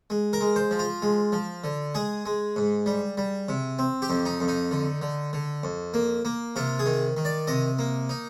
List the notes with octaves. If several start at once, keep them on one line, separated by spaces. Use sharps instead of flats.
G#3
A#4
G#3
C5
F3
F4
G#3
F3
D3
G#3 G#4
G#3
G#2
G3
G3
C3
C4
G4
F2
D#4
F2
D#4
D3
D3
D3
F2
A#3
A#3
C3 F4
G#4
D#3
D#3
D5
C3 D#5
A#3
D#4